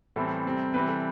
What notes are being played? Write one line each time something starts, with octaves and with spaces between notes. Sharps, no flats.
A2 E3 G3 C4 A4
C3 G3 C4
C3 E3 G3 C4 B4
A4